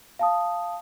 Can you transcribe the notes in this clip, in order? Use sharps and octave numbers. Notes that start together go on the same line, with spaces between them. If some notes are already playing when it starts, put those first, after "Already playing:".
F5 A5 D#6